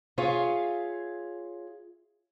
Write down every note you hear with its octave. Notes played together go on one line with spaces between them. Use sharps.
F4 G#4 C#5 E5 F5